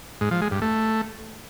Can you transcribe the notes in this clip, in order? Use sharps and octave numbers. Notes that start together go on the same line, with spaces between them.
G#2
F3
G#3
G2
A3